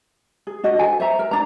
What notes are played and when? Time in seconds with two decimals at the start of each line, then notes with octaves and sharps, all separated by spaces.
0.47 G#4
0.63 D4 F#4 D#5
0.79 A4 C5 G#5
1.00 C5 E5 A#5
1.19 A#4
1.31 D4 A#5